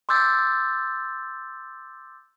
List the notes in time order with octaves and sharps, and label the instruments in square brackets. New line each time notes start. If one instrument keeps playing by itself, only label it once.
[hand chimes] C6 D6 E6 G6 A6